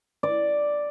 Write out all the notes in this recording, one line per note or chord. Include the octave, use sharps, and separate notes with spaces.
D5